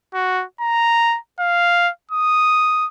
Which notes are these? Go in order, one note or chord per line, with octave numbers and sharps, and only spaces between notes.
F#4
A#5
F5
D#6